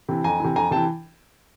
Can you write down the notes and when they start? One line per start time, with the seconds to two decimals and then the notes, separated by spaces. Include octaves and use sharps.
0.09 C3 E3
0.24 F2 G#5 A#5
0.40 C3 E3
0.56 F2 G#5 A#5
0.71 C3 E3 G5 A5